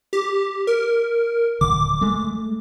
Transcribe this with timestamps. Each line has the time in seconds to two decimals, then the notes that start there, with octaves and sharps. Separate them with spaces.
0.13 G4
0.67 A#4
1.61 D1 D3 D6
2.01 G#3 A3